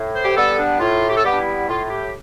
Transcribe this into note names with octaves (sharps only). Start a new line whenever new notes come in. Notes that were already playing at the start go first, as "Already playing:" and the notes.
Already playing: A2
C5
G4
G3 B3 A4
D4
A2 F4
G4
A4
G3 B3 G4
D4
E4
A2 F4
F4
G4